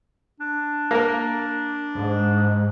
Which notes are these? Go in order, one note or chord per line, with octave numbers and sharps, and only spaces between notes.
D4
A#3 A#4
G#2